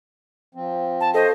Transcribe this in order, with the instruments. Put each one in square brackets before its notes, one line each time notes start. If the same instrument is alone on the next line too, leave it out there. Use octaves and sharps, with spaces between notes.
[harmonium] F3 C4
[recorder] A5
[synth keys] A4 F5 C#6 [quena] C5 [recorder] D#5